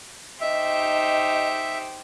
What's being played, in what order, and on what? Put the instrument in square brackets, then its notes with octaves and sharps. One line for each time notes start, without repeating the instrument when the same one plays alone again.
[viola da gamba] D#4 G4 C5 [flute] D#5 [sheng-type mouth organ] E5